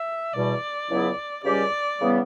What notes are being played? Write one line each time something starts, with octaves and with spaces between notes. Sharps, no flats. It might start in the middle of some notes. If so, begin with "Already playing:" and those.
Already playing: E5
E2 B2 G3 D5
C#2 C#3 F#3 B3 E4
C#2 C#3 G3 C#4 G4 D5
C#3 E3 G3 B3